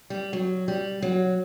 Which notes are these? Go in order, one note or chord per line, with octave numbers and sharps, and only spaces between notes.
G3
F#3
G3
F#3